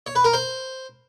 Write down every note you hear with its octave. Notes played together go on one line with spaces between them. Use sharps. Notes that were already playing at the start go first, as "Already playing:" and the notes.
C#5
B4
A#4
C5